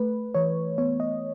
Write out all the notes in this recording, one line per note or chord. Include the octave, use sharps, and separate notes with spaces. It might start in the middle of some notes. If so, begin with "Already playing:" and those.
Already playing: A3 B4
E3 C#5
B3 C#5
D#5